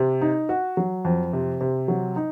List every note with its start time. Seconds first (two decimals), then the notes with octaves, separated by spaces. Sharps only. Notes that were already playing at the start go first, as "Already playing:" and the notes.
Already playing: C3
0.21 D#4
0.49 F#4
0.77 F#3
1.05 F2
1.33 C3
1.61 C3
1.88 F#3
2.16 D#4